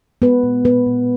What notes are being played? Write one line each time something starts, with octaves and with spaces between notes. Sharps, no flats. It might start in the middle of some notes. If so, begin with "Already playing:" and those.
G#3 B3 B4
A#2
A#2 B3 B4
A#2